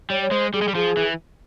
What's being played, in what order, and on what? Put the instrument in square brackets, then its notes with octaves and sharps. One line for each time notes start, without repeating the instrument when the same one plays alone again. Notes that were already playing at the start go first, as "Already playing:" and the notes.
[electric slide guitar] G3 [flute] C#5
[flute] C#5
[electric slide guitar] G#3 [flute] C5
[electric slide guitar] G3 [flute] G#4
[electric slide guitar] G#3
G3
[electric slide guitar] F3 [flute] G#4
[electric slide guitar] E3